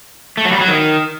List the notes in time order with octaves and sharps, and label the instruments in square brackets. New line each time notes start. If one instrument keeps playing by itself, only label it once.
[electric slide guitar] A3
F#3
G3
F#3
D#3